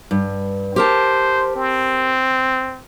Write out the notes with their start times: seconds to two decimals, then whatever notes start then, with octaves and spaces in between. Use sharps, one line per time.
0.11 G2
0.76 G4 A#4 C5 A5
1.56 C4